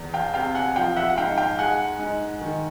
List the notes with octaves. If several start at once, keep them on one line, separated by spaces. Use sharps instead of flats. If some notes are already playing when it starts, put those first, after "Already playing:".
Already playing: E2
F5 G5
C3 F5 G5
F#5 G#5
F3 F5 G5
E5 F#5
F#5
G#2 F5 G5
F5 G5
G#3 F#5 G#5
G#2
D#3